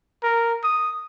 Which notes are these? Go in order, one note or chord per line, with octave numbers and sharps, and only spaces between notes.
A#4
D#6